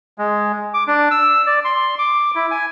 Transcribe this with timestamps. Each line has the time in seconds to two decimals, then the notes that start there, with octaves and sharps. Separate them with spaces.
0.18 G#3
0.74 D6
0.87 D4
1.11 E6
1.46 D5
1.65 C6
1.99 D6
2.35 E4
2.51 G#5